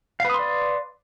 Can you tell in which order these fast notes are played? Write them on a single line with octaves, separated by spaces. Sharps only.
F5 B4 D#6 C6 D5